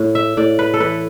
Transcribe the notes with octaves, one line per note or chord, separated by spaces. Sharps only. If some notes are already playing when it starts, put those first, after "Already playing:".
Already playing: A2
E5
A2 D5
B4
A4
E3 B4